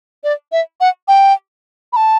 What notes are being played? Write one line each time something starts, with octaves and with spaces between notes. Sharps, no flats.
D5
E5
F#5
G5
B5
A5